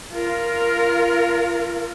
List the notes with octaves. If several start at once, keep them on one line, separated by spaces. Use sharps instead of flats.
F4 A#4